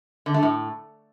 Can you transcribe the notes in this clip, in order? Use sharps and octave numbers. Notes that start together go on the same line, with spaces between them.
D3
A3
A2